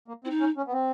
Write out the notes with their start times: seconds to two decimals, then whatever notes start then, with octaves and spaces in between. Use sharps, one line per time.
0.08 A#3
0.24 C4 E4
0.30 D#4
0.40 C#4
0.57 C#4
0.67 B3
0.73 C4